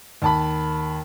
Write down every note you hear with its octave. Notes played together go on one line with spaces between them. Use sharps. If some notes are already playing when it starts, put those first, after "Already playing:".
D#2 A5 B5